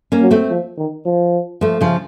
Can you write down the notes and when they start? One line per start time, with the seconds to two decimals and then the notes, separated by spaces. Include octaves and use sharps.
0.12 A#3 C#4
0.22 F#3
0.31 A3 C4
0.50 F3
0.78 D#3
1.06 F3
1.61 F3 A3
1.81 C#3 F3